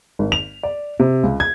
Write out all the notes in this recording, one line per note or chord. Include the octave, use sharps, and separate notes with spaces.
G#1
F7
D5
C3
C#2
G#6